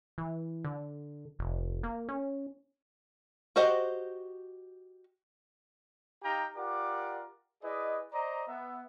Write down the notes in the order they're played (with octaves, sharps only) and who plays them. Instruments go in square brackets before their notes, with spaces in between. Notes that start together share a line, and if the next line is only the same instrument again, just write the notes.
[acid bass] E3
D3
F1
A#3
C#4
[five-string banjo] F#4 G4 C5 D#5 F#5
[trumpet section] D#4 G4 F5 G5 A#5
F4 G4 A#4 D5 F#5 D6
E4 G#4 B4 D5 D#5
C5 D5 D#5 A#5
B3 E5